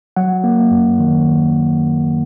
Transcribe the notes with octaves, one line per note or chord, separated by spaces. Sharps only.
F#3 F#5
A#3
F#2
D#3